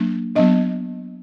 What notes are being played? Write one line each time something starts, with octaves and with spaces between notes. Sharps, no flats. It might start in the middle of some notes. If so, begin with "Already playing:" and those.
Already playing: F#3 A#3 D4
F#3 B3 D4 D#5